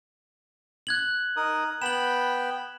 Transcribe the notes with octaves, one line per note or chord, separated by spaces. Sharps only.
F#6 G#6 F#7
D#4 A#4 D#6
B3 G5 B5 E7 F#7